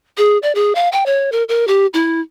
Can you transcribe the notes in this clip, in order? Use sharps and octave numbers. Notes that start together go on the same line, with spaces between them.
G#4
D5
G#4
F5
G5
C#5
A#4
A#4
G4
E4